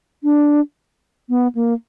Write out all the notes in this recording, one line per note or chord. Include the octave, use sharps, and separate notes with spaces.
D4
B3
A#3